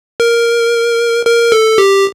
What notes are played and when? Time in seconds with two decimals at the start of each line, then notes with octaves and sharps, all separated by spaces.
0.20 A#4
1.25 A#4
1.52 A4
1.78 G4